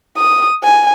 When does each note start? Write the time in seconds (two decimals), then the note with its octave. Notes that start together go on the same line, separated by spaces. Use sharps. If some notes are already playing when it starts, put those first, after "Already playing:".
0.17 D#6
0.64 G#5